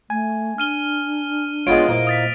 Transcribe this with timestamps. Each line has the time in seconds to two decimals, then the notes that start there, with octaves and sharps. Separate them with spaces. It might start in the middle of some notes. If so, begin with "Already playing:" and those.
0.10 A3 G#5
0.58 D4 F6 D#7 G7
1.67 G#3 B3 F4 C#5 D7
1.89 A#2 A#3 E4 C5 D#5
2.07 D#6 A6 B6